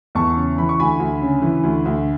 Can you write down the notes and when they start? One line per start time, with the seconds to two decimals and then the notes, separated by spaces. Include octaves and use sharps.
0.15 E2 A5 C#6
0.36 C#3
0.58 E3 B5
0.69 C#6
0.79 D2 G#5 B5
0.99 D2
1.22 C#3
1.42 E3
1.63 D2
1.85 D2